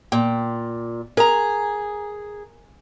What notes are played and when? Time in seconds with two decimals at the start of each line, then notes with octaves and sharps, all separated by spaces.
0.12 A#2 G5
1.17 G#4 A#4 A#5